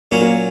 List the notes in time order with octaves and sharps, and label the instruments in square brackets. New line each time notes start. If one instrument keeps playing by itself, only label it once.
[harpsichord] A#2 F#3 C#4 [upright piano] A#3
[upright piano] A#3